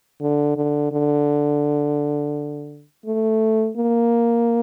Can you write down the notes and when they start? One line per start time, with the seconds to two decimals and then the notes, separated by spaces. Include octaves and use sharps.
0.21 D3
0.57 D3
0.92 D3
3.06 A3
3.77 A#3